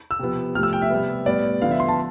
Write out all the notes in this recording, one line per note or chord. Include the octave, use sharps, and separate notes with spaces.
E6
C3 F3 B3
C3 F3 A3 F6
E6
G5
E5
C3 G3 B3
A2 G3 B3 D5
D3 F3 B3 F5
E5
C6
A5